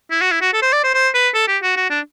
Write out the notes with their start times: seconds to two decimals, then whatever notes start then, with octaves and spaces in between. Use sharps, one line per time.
0.11 E4
0.21 F#4
0.31 E4
0.42 F#4
0.53 A4
0.62 C5
0.73 D5
0.84 C5
0.94 C5
1.14 B4
1.34 A4
1.48 G4
1.63 F#4
1.76 F#4
1.90 D4